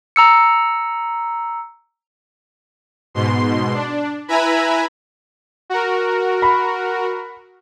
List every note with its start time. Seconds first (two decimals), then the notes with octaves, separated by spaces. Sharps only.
0.16 A#5 E6 C#7
3.14 G#2 B2 C6
3.73 D4
4.28 E4 B4 E5 G#5 A#5 B5
5.70 F#4 A#4
6.42 B5